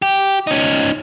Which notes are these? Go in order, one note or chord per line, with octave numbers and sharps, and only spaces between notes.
G4
C#4 D#4